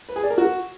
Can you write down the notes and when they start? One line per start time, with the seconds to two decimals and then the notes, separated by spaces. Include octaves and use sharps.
0.09 B4
0.16 G#4
0.23 D5
0.30 A#4
0.38 F#4